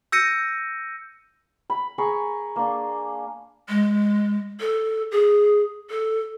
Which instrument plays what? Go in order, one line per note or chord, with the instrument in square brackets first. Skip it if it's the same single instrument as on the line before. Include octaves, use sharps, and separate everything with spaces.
[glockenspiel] E6 G6 A#6 C#7 D#7
[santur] B5
G#4 A#4 B5 C#6
A#3 D4
[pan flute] G#3
A4
G#4
A4